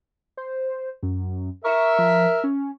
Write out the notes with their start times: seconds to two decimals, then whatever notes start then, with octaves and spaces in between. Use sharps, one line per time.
0.37 C5
1.03 F#2
1.64 A#4 E5 C#6
1.99 F3
2.44 C#4